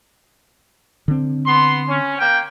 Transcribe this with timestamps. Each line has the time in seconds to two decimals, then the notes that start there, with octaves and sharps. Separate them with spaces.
1.08 D3 C4
1.45 B3 C6
1.88 C#4
2.18 A#3 G5